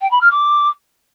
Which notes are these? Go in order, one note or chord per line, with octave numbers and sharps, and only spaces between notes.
G5
B5
F6
D6